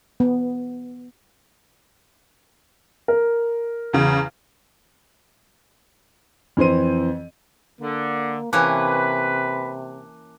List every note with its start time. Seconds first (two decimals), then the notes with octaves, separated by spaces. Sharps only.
0.20 B3
3.08 A#4
3.93 E2 C#3
6.57 F2 E3 C4 C5 D#7
7.81 D3 A#3
8.53 C3 E3 A#3 C#4 B4 A5 D6 F#6